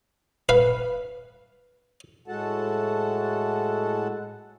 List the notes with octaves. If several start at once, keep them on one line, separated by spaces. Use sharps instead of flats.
B4 F5
A2 G#3 F#4 A4 F#5 A5